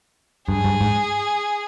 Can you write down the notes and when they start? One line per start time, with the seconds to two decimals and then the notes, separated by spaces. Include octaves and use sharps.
0.48 G2 G#4
0.65 G2
0.81 G#2